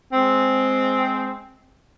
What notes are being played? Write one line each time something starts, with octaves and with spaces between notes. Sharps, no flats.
G#3 C4